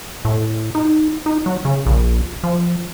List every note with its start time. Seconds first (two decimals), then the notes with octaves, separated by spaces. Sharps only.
0.25 A2
0.75 D#4
1.26 D#4
1.46 F#3
1.65 C#3
1.86 A#1
2.44 F3